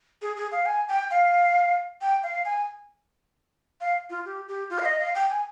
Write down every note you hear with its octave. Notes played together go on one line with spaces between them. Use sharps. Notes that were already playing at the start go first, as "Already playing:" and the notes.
G#4
G#4
F5
G#5
G5
F5
G5
F5
G#5
F5
F4
G4
G4
F4
F5
D#5
F5
G5
G#5